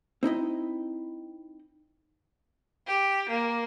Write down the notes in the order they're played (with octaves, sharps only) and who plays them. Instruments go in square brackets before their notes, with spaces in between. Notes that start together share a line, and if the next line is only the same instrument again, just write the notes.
[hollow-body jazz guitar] C4 D#4 E4 D#5
[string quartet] G4
A#3